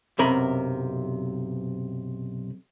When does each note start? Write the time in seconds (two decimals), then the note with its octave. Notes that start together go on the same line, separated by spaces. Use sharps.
0.19 B1 F#2 C3 A#4 B5